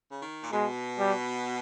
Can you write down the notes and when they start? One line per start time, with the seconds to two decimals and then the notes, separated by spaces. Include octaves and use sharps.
0.10 C#3
0.21 D#3
0.43 A#2
0.52 B2 G#3
0.99 G3